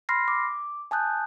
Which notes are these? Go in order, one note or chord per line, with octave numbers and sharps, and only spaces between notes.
B5 C6 F6 A#6 C7
D6
G#5 A5 D#6 F#6 G6